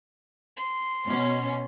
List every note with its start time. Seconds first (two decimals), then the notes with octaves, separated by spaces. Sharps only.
0.57 C6
1.06 B2 C#4